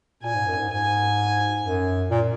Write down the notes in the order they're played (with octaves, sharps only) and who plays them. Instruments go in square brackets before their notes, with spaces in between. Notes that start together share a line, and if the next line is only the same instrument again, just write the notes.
[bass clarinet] A#2 [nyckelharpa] G#5
[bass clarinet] G#2
F#2
G#2
[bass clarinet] G#2 [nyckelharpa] G#5
[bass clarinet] F#2
A#2